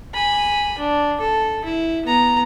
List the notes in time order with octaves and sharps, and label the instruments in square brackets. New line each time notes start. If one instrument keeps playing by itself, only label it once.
[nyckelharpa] G#5 B5
D4
A4
E4
B3 A#5